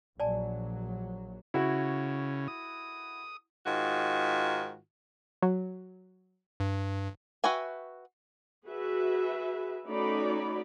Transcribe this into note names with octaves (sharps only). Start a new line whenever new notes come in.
A#1 F#3 D5 G#5 A5
C#3 E4 F#4
D#6
G#2 D#3 F4 F#4
F#3
G2
F#4 B4 E5 G5 G#5
F#4 G#4 B4 E5
A3 C#4 D#4 F#4 D5 B5